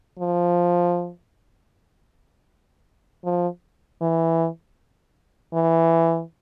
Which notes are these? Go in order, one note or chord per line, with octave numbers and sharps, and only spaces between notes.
F3
F3
E3
E3